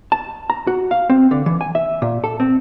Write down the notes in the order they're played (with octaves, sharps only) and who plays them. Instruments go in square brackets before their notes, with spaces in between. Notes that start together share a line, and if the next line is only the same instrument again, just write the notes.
[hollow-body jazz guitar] A5
A#5
F#4
F5
C4
D3
E3
G#5
E5
A#2
A4
C4